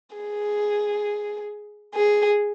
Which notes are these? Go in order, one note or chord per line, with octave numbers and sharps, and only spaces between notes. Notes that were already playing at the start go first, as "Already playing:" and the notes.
G#4
G#4